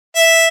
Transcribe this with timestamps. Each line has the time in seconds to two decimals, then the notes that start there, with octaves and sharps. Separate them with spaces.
0.15 E5